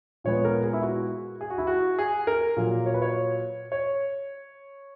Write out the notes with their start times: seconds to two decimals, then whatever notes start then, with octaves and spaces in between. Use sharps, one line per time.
0.24 A#2 G#3 B3 C#5
0.45 A#4
0.63 G#4
0.73 E4
0.82 F#4
1.41 G#4
1.50 F#4
1.58 E4
1.67 F#4
1.99 G#4
2.27 A#4
2.56 A#2 F#3 A#3
2.86 C#5
2.94 B4
3.02 C#5
3.72 C#5